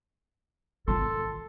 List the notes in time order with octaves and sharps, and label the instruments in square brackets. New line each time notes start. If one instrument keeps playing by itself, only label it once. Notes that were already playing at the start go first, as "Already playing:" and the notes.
[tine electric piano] G#1 A5 C6 [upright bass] D#3 F4 [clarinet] A4